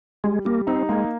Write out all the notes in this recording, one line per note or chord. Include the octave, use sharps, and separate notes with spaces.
G3 G#3
G3 A#3
C4 D#4
G#3 A#3